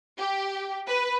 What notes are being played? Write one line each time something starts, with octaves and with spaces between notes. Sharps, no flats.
G4
B4